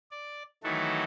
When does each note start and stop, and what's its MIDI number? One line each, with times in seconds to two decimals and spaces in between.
0.11 0.43 74
0.64 1.04 51
0.64 1.04 52
0.64 1.04 54
0.64 1.04 57
0.64 1.04 66
0.64 1.04 69